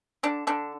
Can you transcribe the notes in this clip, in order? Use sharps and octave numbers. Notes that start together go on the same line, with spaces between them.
D3 D4
D3 D4